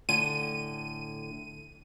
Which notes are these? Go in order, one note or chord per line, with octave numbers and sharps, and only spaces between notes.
A2 D3 G#5 D#7